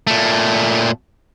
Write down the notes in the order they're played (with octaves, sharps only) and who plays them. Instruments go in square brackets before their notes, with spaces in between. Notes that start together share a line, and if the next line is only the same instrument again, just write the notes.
[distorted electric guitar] A#2 A3